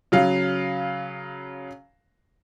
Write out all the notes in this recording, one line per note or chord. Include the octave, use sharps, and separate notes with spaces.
C#3 F#3 F5